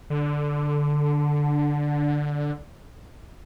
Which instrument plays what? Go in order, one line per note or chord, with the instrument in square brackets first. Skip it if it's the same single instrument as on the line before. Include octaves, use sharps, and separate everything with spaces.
[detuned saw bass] D3